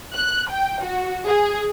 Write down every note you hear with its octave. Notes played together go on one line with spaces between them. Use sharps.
F#6
G5
F#4
G#4